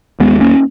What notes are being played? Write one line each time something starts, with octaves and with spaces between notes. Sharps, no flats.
D#2 G#3 B3
A#3 C#4